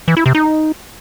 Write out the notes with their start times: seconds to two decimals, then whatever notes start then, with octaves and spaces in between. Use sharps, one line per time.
0.08 E3
0.17 E4
0.26 C3
0.35 D#4